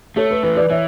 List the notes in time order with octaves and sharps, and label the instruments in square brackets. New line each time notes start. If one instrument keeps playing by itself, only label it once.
[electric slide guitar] A3 [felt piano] A4 C#5
[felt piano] B4
[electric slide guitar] E3 [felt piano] B4
[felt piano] B4 D5
[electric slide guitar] E3 [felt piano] C#5 E5